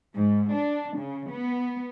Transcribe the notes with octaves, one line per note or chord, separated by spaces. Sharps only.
G#2
D4
C#3
B3